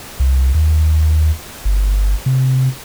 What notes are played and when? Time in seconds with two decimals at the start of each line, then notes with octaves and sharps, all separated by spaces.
0.20 C2
0.55 D#2
1.65 G1
2.26 C3